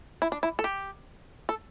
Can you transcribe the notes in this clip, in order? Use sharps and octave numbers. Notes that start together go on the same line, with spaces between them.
E4
D4
E4
A4
G4
A4